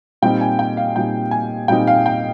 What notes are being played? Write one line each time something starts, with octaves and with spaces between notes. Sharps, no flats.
A#2 G3 C4 D#4 G5
G#5
G5
F5
A#2 G3 C4 D#4 G5
G#5
A#2 G3 C4 D#4 G5
F5
G5